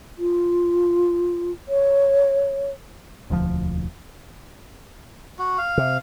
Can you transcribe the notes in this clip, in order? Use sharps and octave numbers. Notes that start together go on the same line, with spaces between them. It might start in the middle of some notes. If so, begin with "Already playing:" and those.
F4
C#5
E1 D2 E3 F3
F#4
F5
C3